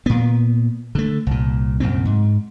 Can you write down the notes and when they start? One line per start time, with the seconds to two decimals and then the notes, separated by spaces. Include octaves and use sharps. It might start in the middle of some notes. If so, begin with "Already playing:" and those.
0.06 A#2 B3
0.95 D3 A3
1.27 C2 A#2
1.80 C2 F#2 A#2 C4
2.05 G#2